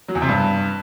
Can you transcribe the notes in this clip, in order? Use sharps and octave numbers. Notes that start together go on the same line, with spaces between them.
F#3
E2
C3
G2